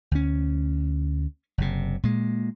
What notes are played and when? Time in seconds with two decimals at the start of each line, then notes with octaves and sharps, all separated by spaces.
0.11 D2 C#4
1.58 F#1 C3
2.03 A#2 G#3